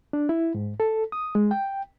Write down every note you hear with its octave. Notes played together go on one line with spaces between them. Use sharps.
D4
E4
G#2
A4
D#6
G#3
G5